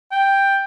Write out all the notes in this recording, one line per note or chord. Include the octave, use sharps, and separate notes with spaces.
G5